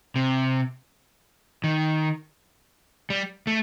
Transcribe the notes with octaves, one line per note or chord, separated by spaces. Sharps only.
C3
D#3
G3
A3